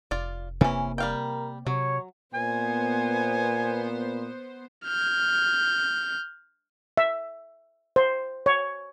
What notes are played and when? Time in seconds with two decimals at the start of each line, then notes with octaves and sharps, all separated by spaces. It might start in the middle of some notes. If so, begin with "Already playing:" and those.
0.11 F1 F4 D5
0.61 C3 E3 A#3 C#4
0.98 G3 A#4 F5 G5
1.67 C3 F#3 C#5
2.34 A#2 B3 C5 G#5
4.85 F6 G6
6.97 E5
7.96 C5
8.46 C#5